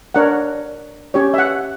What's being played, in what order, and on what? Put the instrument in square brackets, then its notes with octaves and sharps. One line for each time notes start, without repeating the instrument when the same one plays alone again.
[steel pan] D4 A#4 C#5 F#5
C#4 G4 C#5
E5
F#5